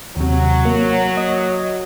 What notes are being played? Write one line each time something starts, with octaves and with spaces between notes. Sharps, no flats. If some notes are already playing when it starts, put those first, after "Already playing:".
D#2 C3 F#3
A#3
D#5